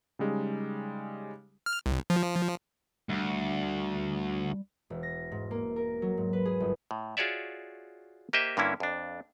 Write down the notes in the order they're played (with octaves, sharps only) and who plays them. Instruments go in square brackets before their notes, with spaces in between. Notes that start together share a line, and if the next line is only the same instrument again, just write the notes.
[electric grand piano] C#3 G3 G#3 C#4 D#4
[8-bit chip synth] F6
C2
F3
[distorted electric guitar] D2 [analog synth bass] G3
[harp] E1
A#6
G#2
A#3
A#4
F#3
G#2
B4
G#4
G1
[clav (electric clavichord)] A2
F4 F#4 G#4 C#5 D5 E5
A#3 G4 C5 D#5 E5
G2 D3 A#3 C#4 E4
F2 D4